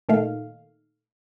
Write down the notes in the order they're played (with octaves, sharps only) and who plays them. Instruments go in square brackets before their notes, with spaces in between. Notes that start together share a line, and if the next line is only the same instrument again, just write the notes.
[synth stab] A#2 D#3 A3 F5